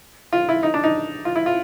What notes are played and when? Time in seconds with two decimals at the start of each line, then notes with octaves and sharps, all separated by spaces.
0.33 F4
0.49 E4
0.63 D#4
0.74 D4
0.84 D#4
1.25 F4
1.36 E4
1.46 F4